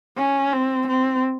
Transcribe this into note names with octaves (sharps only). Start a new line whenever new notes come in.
C#4
C4
C4